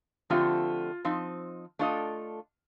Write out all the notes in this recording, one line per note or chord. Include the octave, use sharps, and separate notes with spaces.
D3 F3 A3 C4 F4 G4
F3 C4 D#4
A3 D4 F4 A4 D#5